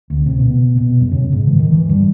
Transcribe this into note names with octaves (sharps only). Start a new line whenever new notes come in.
D2
C3
B2
B2
F#2
C#3
G#2
E3
D#3
E3
G2